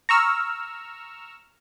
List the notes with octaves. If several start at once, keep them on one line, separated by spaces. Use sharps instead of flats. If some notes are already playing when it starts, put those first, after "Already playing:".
A#5 C#6 E6 F6